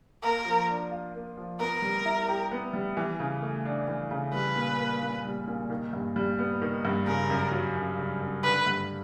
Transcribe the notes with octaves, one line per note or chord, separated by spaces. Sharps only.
A#3 A#4
F3
D4
F4
A#3
F3
B3 A#4
G3
E4
G4
B3
G3
E3
C#3
A3
D4
E3
C#3
G3 B4
A#2
A#3
A#2
G3
A#2
D#3
G2
G3
B3
D#3
G2
C#3 A#4
F#2
F#3
F#2
C#3
F#2
D3 B4
G2